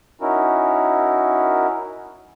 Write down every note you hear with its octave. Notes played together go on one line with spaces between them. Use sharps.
C#4 D#4 E4 F#4 A#4